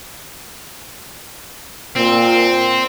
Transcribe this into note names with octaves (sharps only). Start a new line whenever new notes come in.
A#2 C4